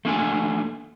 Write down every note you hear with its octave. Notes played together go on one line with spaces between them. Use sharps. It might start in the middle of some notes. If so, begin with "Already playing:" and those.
A3 A#3 D4 G#5